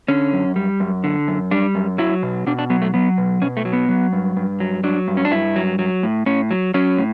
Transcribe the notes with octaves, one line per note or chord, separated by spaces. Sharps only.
D3 C#4
F#2
G3
F#2
D3
F#2
G3 D4
F#2
F#3 E4
B2
B2 D4
D4
F#3 B3
A3
F#3 B3
B2
B2 C#4
A3
F#3
B3
F#3
G2
G2
F#3
F#3 D4
G2
C#4
D4
G2 E4
F#3
F#3
A2
A2 C#4
F#3
F#3 C#4
A2